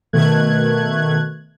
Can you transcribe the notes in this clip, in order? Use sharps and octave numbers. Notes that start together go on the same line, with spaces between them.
B2 D#3 A3 F#6 G#6